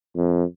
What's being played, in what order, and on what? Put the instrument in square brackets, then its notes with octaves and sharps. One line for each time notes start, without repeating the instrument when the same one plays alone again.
[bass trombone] F2